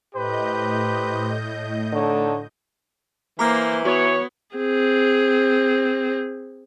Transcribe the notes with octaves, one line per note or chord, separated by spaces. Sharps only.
A2 G4 B4 C5 D#5 G6
D3 D#4 A4 C#5
E3 A#3 C5 A#5 D6 F6
B3 F#4 C#5
C4 G#4